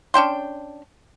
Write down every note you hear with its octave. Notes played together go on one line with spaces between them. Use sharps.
C#4 D4 G5 C6